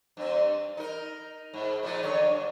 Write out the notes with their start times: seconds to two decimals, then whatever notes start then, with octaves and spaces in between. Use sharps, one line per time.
0.17 G2 C4
0.77 D#4 A#4
1.53 G#2
1.83 A#2 F3 G#3
2.03 F#2 D3 C#5
2.29 G2